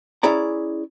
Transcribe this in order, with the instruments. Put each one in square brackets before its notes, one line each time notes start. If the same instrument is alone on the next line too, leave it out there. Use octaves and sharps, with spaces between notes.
[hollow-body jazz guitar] C#4 E4 G#4 D5 A#5